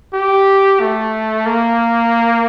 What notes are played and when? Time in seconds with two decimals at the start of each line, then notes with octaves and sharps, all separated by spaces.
0.14 G4
0.80 A3
1.46 A#3